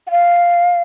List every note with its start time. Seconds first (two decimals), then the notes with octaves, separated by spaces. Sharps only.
0.07 F#5
0.11 F5